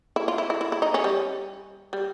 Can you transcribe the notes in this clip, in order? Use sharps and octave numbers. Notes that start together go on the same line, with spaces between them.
E4
F4
E4
E4
E4
E4
D#4
C#4
G3
G3